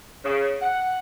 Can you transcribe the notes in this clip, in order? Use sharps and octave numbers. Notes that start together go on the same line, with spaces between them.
C#3
F#5